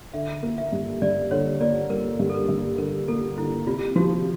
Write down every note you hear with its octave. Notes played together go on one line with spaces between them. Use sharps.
D3 E5
A#3
E5
G2
G2 D5
D3 C#5
A#3 D5
G3 A#4
G2
A4
A#4
G2
D3 A#4
A#3 A4
D3 E4
C3 F4
F3 F#4